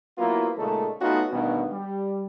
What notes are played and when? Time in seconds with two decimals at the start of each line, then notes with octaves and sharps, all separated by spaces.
0.18 F#3 A#3 B3 E4 F4
0.58 A#2 C#3 G#3 A3 D#4 A4
1.01 A3 B3 C#4 D#4 F4 F#4
1.31 D2 G2 B2 D#3 B3
1.71 G3